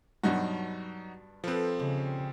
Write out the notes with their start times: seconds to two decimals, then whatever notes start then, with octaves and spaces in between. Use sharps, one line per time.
0.23 G2 B2 F#3 D4 D#4 F#4
1.44 F3 C4 A4 B4
1.79 D#2 C#3 G3